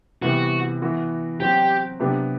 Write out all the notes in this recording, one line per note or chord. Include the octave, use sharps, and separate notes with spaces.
C3 E3 G3 B3 F#4
E3 B3 F#4
F#3 C4 F#4 G4
C3 F#3 B3 D4 G4